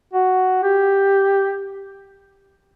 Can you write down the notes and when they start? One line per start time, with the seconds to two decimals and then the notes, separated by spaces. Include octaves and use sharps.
0.14 F#4
0.63 G4